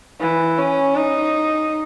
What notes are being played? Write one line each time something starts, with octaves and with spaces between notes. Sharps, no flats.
E3
C#4
D#4